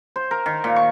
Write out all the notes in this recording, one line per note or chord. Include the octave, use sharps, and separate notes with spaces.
C5
A#4
D#3
A#2
C#6